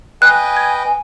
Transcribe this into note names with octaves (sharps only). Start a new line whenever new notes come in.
B4 D#5 G5 G#5 F#6
G#6